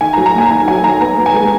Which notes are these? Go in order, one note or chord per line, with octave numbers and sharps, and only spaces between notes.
D#3 G#5
A#5
F#3
A#5
A#3 G#5
D#3 A#5
F#3 G#5
D#3 A#5
B3 A#5
B3
G#5
G#3